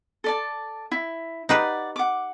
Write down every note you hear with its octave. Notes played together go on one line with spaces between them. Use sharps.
A4 D5 A5
E4
D#4 G4 B4 D5 F#5
F#5 D6